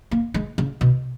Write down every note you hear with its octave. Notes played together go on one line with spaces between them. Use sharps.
A#3
G#3
C#3
B2